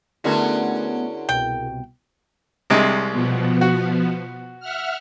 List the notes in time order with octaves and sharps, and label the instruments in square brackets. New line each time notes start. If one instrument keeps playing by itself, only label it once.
[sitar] D3 C#4 F#4 [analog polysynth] A3 B3 [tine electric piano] E4 G#4 A#4
[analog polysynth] C2 B2 [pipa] G5
[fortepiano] C2 C3 G#3
[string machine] B2 F3 B3
[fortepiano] F#4
[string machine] E5 F#5 F6